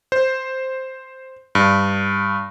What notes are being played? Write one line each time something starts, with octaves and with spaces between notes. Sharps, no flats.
C5
G2